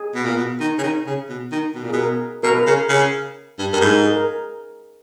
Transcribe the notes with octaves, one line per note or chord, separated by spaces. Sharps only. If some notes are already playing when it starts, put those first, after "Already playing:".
Already playing: G#4
B2
A#2
B2
D#3
C#3
D#3
C#3
B2
D#3
B2
A#2
B2 G#4
A#4
B2 A#4
B4
C#3 A#4
C#3
G2
G2 A#4
G#2 B4
A#4
G#4
A#4